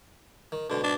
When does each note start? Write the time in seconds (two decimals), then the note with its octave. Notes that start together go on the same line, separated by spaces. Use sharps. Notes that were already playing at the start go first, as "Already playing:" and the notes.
0.52 D#3
0.70 G#2 B2 D3
0.83 D4